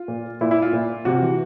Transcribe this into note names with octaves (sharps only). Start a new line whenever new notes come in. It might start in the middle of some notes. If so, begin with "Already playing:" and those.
Already playing: F4
A#2
A#2 E4
E4
F4
A#2
C3 F#4
E3